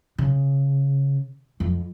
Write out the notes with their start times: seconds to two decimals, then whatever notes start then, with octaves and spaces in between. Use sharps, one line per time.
0.18 C#3
1.60 F2